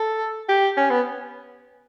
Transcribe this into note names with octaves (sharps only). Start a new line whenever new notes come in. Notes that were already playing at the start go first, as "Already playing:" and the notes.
Already playing: A4
G4
C#4
B3